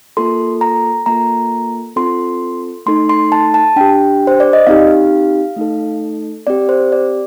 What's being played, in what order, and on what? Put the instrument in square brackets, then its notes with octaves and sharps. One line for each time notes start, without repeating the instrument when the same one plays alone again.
[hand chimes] A#3 F4 A4 C6
A#5
A#3 F4 A4 A#5
C4 F4 A4 C6
A3 D#4 A4 C6
C6
A5
A5
D4 G4 G5
C5
D5
D#5
C4 D#4 G4 F5
A3 D#4 A4
C4 G4 D5
C5
D5